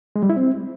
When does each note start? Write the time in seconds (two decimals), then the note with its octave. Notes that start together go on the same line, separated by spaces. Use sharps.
0.16 G#3
0.23 G3
0.30 E4
0.37 C4